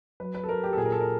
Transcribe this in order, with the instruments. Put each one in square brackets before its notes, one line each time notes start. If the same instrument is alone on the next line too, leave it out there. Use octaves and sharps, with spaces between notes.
[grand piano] F#3 B4
B4
A4
F#3 A#4
G4
A4
A#2 G#4
A#4
A4
A#4